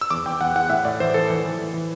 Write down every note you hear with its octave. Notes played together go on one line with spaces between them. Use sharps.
E6
E2 D6
E2 G5
E2 F#5
E2 F#5
A2 E5
A2 D5
E3 C5
E3 A4
E3
E3
E3
E3